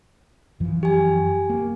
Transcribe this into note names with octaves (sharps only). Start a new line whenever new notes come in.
F#2 E3 F3
G4 G#5
A#3